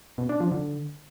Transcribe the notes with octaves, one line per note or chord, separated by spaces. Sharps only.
B2
D4
F3
D3